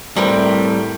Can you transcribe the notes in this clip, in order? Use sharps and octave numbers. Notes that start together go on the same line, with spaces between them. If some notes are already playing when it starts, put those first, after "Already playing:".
A2 G3 C4 A#4 B4